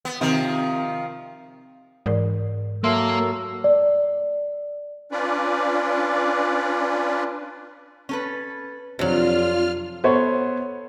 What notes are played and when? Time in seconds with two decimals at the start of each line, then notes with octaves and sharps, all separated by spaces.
0.05 B3
0.21 C3 D#3 F3
2.06 G#2 E3 A#4 D5
2.84 F#3 A#3 A4 E5 C6
3.64 D5
5.12 C#4 D4 F4 B4 D5
8.09 C#4 A4 B4
8.99 F2 C3 F#3 D4 F4 F6
10.04 B3 A4 C5 C#5